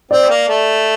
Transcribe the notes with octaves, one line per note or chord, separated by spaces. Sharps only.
C4 D5
A#3
A3